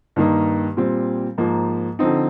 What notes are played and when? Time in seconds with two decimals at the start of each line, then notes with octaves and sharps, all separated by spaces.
0.16 G2 D#3 A#3 D#4
0.77 A#2 G3 C4
1.38 G#2 F3 A#3
1.99 D3 F3 C4 D#4